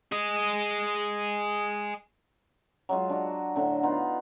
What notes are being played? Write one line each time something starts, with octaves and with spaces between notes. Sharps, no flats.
G#4 D#5
F#3 G#3 F4
D4 F#4
A2 D3
B3 D#4 F4